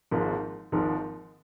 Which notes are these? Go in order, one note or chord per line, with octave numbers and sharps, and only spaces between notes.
G#1 G#2 F3 A#3
G#1 G#2 F3 A#3